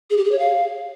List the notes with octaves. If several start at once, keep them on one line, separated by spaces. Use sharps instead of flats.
G#4
G4
G#4
C#5
F5